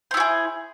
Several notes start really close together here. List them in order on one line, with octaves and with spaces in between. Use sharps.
C5 E4 F#4 G#4